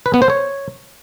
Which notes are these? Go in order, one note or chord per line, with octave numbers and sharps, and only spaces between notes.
B4
B3
C5
C#5